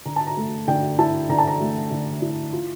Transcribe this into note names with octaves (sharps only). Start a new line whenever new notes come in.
D3 A#5
A5
A#5
A3
D3 G5
E4 A5
D3 A#5
A5
A#5
A3
D3
E4
F4